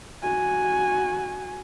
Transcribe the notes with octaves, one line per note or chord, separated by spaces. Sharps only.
F#4 G#5